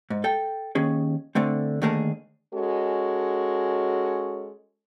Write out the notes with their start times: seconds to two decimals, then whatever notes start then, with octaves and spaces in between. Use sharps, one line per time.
0.10 G#2
0.24 A4 G5
0.75 D#2 C#4 G#4
1.35 D3 A3 C4
1.82 D#2 D3 A3 G#4 A#4 A5
2.54 G#3 C#4 F#4 A4